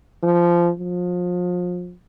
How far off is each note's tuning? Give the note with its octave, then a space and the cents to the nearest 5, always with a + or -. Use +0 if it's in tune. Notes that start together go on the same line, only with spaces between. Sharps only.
F3 -15
F3 +30